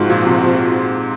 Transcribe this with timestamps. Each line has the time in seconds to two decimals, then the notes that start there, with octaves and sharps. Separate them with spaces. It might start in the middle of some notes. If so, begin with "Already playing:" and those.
Already playing: G#2 F3 C4 F#4
0.10 A#2
0.26 C3
0.42 C3